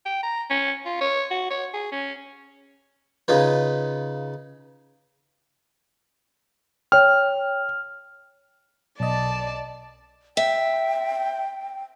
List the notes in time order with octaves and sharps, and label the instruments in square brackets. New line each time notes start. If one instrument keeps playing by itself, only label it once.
[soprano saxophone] G5
A#5
C#4
F4
C#5
F#4
C#5
G#4
C#4
[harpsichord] C#3 D#4 F4 B4
[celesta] C#5 G5 [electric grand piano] F6
[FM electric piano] B1 D#5 [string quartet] D5 A5
[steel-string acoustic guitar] E5 [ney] G5